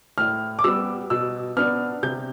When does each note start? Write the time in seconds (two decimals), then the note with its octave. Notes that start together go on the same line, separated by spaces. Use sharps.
0.18 A2 F6
0.59 D6
0.64 G3 B3 E6
1.10 B2 E6
1.57 B3 D4 F6
2.03 C3 G6